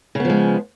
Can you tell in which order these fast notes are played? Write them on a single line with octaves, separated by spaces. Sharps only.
C#3 B3 F3 G#3